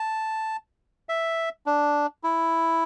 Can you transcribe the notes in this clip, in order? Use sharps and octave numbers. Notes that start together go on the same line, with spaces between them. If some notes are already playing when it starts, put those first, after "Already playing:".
Already playing: A5
E5
D4
E4